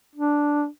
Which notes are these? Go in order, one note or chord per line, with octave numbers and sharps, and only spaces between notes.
D4